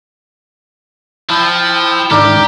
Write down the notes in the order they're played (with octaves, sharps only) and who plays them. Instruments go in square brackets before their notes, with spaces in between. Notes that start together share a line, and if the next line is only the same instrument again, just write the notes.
[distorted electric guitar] F3 [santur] E4 [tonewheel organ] G5 E6
[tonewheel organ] G#2 D3 D#3 [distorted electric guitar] G4 [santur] A#4 D5 E5